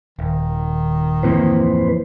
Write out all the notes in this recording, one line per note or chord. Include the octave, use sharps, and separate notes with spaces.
D#1 D#3
D1 F2 E3 A#3 B4 C5